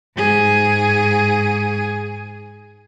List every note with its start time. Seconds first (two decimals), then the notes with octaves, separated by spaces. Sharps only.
0.15 G#2 G#4